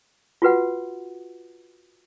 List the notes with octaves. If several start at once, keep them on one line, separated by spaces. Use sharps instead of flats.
F4 F#4 B4 F#5